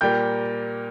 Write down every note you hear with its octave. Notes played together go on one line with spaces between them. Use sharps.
A#2 G3 A#3 G5 G6